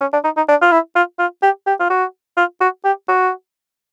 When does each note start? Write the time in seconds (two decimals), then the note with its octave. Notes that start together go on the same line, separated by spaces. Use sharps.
0.01 C#4
0.13 D4
0.24 D#4
0.36 D#4
0.48 D4
0.62 F4
0.72 E4
0.95 F4
1.19 F4
1.43 G4
1.67 G4
1.80 F4
1.90 F#4
2.37 F4
2.61 F#4
2.85 G4
3.08 F#4